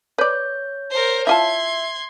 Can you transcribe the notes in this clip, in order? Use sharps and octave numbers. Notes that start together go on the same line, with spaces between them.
B4 C#5 D5 G6
A#4 C5
E4 F4 E5 A5 C6 G#6